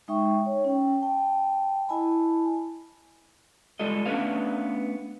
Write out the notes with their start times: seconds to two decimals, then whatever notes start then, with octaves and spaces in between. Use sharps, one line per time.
0.08 G#3 D#4 E5 G5 C#6
0.46 C#5
0.64 C#4 G5
1.02 G5 A5
1.89 E4 D#5 G#5 A5 B5
3.79 G3 G#3 F4 A4 D#5
4.06 A3 B3 C#4 D4 B4 F5